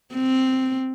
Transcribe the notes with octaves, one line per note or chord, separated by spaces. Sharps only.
C4